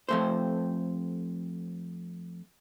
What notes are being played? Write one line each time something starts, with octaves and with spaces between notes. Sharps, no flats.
F2 A3 C5